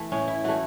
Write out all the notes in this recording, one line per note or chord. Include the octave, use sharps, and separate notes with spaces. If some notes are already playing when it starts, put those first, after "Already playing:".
Already playing: E3 A3
A2 C#4
E4
E3 A3 F#4